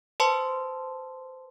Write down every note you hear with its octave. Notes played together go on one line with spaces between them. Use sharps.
B4 C5 A5 C6